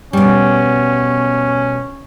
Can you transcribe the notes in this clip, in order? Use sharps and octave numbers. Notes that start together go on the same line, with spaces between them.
B2 G3 C#4